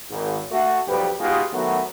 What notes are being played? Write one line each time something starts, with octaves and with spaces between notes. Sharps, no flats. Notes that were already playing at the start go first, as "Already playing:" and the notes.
G#1
A3 F#4
B1 F2 G3 G4 B4
B2 G#3 D#4 F4 G4 G#4
D#3 F#3 A3 B3 F#4